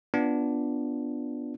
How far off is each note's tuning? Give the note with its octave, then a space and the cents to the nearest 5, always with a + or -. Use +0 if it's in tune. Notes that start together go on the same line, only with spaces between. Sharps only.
B3 +0 D4 -5 F4 +0